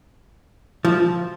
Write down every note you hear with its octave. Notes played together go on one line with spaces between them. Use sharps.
F3